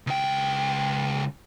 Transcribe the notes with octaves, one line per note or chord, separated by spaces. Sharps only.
C#2 G5